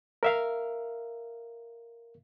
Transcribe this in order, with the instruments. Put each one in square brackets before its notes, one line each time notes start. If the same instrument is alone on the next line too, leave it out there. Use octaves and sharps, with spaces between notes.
[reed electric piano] A#4 E5 F5